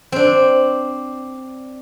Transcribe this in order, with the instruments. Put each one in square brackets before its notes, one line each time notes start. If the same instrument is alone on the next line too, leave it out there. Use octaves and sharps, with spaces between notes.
[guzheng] C4 D4